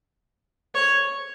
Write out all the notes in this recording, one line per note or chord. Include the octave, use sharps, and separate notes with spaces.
C#5